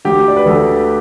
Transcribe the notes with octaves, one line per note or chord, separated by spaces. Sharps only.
D2 G4
D5
B4
D2 A4